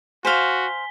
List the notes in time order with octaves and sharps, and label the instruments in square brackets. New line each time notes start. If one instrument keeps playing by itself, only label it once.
[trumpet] F#4 [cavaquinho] C5 F5 [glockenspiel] G#5 B6 G7